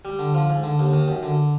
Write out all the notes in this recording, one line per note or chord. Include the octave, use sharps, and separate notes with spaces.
G3
D3
F3
G#2
D3
D#2
D#3
F#2
D3